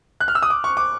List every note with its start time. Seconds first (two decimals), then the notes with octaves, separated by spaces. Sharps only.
0.20 F#6
0.28 F6
0.35 E6
0.42 D#6
0.50 D6
0.64 C#6
0.77 D6